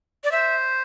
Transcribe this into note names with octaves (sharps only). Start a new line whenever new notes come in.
D5
C5 E5